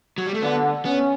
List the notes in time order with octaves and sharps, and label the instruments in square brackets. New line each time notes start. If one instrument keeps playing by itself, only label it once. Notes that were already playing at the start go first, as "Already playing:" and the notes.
[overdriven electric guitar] F#3
G3
A3
[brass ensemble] D3 [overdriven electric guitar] B3
[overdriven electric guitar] B3 [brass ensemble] C#4